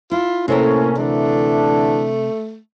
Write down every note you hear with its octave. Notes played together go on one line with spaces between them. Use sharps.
E4 F4
A2 C3 A#3 C#4 A4 A#4
D3 E3 A3 D4